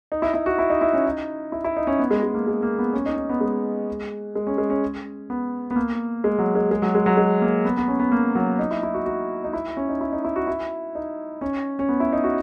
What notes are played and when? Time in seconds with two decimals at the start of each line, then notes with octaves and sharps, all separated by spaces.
0.12 D#4
0.22 E4
0.34 E4
0.46 F#4
0.59 E4
0.70 D#4
0.81 E4
0.94 C#4
1.06 D#4
1.52 E4
1.64 E4
1.76 D#4
1.87 C#4
1.99 B3
2.11 G#3
2.23 G#3
2.34 A#3
2.47 G#3
2.62 A#3
2.79 B3
2.93 C#4
3.06 D#4
3.17 D#4
3.30 B3
3.41 G#3
4.35 G#3
4.47 C#4
4.58 G#3
4.70 C#4
5.30 B3
5.71 B3
5.76 A#3
6.24 G#3
6.39 F#3
6.55 G#3
6.71 G#3
6.82 F#3
6.95 G#3
7.06 F#3
7.17 G#3
7.41 A#3
7.65 B3
7.77 B3
7.88 C#4
8.00 B3
8.12 A#3
8.35 F#3
8.59 D#4
8.71 E4
8.83 E4
8.94 F#4
9.06 F#4
9.44 D#4
9.53 E4
9.77 C#4
9.89 D#4
10.01 E4
10.13 D#4
10.25 E4
10.36 F#4
10.47 E4
10.95 D#4
11.41 C#4
11.79 C#4
11.89 B3
12.00 E4
12.13 D#4
12.24 F#4